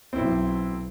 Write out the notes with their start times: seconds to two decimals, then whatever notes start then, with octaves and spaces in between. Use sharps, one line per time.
0.13 B1 C4 E4